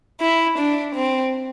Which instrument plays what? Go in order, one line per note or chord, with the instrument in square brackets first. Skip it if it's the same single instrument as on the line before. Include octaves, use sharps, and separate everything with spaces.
[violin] E4
D4
C4